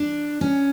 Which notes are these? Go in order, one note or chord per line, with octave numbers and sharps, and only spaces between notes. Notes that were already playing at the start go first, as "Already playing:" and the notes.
Already playing: D4
C#4